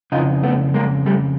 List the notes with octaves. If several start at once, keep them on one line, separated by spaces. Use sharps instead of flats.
F2 C#3 E3 D#4 F4
A3 B3
G#3 A#3
G3 A3